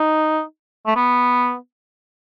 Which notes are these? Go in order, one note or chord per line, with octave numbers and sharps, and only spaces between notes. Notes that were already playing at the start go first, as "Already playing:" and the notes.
Already playing: D#4
A3
B3